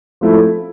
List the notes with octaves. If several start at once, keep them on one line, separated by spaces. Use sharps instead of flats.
F3 A3 E4